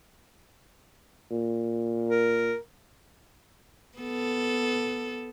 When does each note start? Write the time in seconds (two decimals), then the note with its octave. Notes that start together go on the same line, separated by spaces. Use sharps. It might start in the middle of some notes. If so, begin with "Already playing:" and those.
1.31 A#2
2.09 A#4
3.98 B3 A4